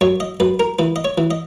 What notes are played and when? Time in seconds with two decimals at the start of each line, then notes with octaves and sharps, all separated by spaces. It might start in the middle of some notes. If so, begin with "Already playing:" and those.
0.01 F#2 C#5
0.20 D#5
0.40 F#2 B4
0.60 A#4
0.79 E3 B4
0.96 D#5
1.05 C#5
1.18 E3
1.31 D#5